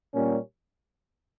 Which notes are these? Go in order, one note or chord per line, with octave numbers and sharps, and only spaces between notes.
A#2 G3 A#3 C#4